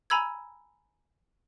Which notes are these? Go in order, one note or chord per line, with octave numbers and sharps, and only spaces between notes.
G#5 A#5 B5 E6 G#6